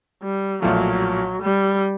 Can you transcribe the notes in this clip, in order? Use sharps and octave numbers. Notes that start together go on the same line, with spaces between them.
G3
B1 A#2 F3 F#3 A3
G3